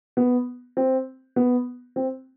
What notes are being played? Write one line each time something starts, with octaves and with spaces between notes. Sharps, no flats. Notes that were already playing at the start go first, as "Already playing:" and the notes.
B3
C4
B3
C4